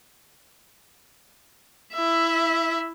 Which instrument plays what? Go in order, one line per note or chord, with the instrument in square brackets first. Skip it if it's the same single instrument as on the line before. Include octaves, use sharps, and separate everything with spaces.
[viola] E4 E5